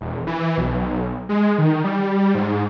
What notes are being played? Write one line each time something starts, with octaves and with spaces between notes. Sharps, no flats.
E1
E3
B1
G#3
D#3
G3
G#2